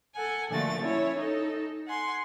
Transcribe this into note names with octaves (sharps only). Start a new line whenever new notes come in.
A4 F#5 G#5
A#2 D3 F3 A3 F#4 A6
C#4 E4 C#5
D#4 A4
F#5 G#5 C6